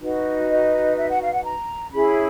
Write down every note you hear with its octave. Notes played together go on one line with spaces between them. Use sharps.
D#4 F#4 B4
D#5
E5
F#5
F5
F#5
A#5
C#4 E4 G#4 B5